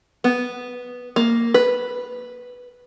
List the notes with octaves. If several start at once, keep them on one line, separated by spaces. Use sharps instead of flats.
B3
A#3
B4